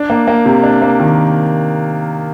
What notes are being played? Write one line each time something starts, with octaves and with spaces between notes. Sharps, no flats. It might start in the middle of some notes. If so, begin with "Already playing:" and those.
Already playing: D4
A#3
A#3
C3
D4
A#3
D#3